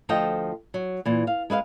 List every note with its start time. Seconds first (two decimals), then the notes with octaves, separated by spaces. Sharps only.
0.09 D2 F3 F4 A4 D#5 G5
0.74 F#3
1.06 A#2 E3
1.27 F5
1.50 G#3 B4 E5 F5